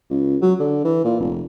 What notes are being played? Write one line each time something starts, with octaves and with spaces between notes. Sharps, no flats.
C#2
F#3
D3
E3
A#2
F1